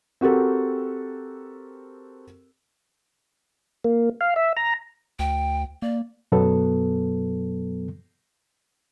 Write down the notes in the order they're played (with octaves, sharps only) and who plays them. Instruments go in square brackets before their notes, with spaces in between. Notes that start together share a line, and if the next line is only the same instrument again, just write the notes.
[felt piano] C4 F#4 G4 A4 A#4
[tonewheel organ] A#3
F5
E5
A#5
[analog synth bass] D2 [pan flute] G5
[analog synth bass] A#3 [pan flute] D5
[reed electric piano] F#2 B2 F#3 B3 A4